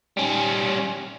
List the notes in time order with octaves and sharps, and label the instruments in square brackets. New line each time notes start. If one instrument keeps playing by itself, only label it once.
[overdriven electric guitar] G3 C#4